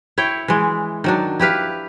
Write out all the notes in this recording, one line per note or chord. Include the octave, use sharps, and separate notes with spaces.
E4 C#5 G5
E3 G#3
D#3 F#3 D4
E4 G4 B4 F5